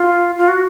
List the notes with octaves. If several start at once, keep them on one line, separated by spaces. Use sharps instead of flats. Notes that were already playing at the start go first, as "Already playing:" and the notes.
Already playing: F4
F4
F#4